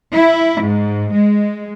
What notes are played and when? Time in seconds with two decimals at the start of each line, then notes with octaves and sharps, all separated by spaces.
0.15 E4
0.61 G#2
1.13 G#3